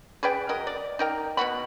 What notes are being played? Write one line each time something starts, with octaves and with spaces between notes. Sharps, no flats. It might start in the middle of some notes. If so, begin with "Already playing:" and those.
G#4 B4 D5 G5
F#3 A#4 D#5
D5
D#4 A#4 G5
B2 B3 F#4 B5